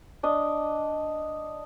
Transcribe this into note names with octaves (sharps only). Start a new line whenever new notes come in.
D4 D#5